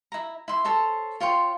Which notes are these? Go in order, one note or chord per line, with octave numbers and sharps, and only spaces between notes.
E4 A#5
E4 C6
A4 C5 C#5
F4 C#5 G5 C6